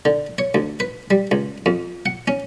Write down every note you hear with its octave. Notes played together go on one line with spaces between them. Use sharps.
D3
C#5
D2
B4
G3
C#2
F2
F#5
C#4